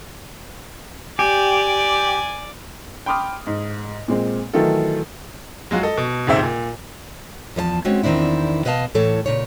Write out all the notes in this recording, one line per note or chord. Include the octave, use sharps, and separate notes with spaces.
G4 D5 G#5
G5 B5 C6 D6 D#6 F6
G#2
A#2 G#3 C4
D#3 E3 F#3 A3 F4 A4
F#3 G#3 F4 F#4
A4 D#5
B2
D#1 C#2 G#2 C3 C4 E5
A#2
E2 F3 C#5 A5
G#3 C4 C#4 F#4
E2 D#3 C4 D4 E4
B2 B4 D#5 F5 A5
A2 E3 A4 C#5
A#2 C#3 C#5